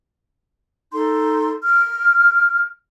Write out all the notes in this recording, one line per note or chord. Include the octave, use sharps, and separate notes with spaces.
D#4 A4 C6
F6